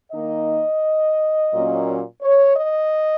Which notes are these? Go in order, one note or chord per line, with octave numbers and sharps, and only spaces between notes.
D#3 A#3 D#4 D#5
A#2 F#3 A#3 C#4
C#5
D#5